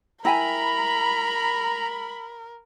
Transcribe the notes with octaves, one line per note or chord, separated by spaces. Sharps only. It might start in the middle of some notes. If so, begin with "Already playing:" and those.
E4 A#4 G5 G#5 A#5 B5